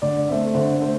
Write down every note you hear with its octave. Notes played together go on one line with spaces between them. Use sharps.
D3 D5
A3 C4 E5
D3 C5
A3 C5